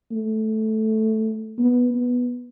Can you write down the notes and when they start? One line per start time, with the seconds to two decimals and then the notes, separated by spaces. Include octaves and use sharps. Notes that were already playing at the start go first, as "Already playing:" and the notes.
0.12 A3
1.58 B3
1.94 B3